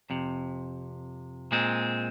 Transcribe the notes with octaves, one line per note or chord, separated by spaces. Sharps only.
F2 C3
A#2 G#3 C4